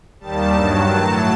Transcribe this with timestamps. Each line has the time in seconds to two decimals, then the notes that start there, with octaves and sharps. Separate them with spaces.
0.20 D#2 D#3 G3 A5
0.53 G2 D#3 F#3
0.86 A2 F#3